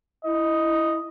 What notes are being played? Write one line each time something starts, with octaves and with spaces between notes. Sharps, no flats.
E4 D#5